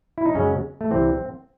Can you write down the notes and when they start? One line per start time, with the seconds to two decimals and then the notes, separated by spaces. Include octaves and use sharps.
0.18 E4
0.26 D#4
0.34 F#2 C#3 G#3 C#4
0.81 A3
0.91 C2 C3 E3 C4